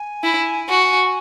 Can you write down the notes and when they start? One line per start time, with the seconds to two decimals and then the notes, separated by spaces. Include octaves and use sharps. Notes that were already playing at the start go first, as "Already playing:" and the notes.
Already playing: G#5
0.23 E4
0.69 F#4